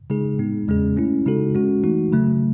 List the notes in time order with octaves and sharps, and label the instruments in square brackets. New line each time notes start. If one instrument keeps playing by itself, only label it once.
[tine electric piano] C#3 G#3 D#4 G#4
A2 G#3 B3 D#4
E2 C#3 G#3 C#4 G#4
A3 C#4 E4
C#3 G#3 D#4 F#4 A4
G#3 C#4 F#4
E3 A3 D#4 F#4
C#3 F#3 A3